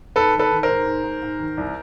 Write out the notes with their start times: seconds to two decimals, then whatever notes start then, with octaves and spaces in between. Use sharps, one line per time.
0.16 G#2 A4 B4
0.34 D#3
0.39 A4 B4
0.51 D#3
0.63 A#4 C5
0.69 G#2
0.86 G#2
1.04 G#2
1.23 G#2
1.39 D#3
1.57 C2